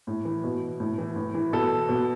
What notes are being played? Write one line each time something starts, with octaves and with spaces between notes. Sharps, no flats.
A2
E3
B2
A2
E3
A2
E3
B2 A4
B2